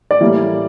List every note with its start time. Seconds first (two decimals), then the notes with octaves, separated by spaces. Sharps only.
0.11 D5
0.21 A2 E3 G3 A#3